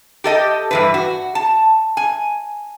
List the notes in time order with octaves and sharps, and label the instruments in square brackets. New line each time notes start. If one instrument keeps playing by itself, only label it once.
[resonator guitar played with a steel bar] G4 A4 D#5
G2 E3 B4
F#4
A5
G#5